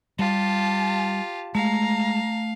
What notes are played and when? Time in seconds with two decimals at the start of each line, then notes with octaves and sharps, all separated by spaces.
0.19 G3 F4 G4 A5
1.55 G#3 A3 F5 A#5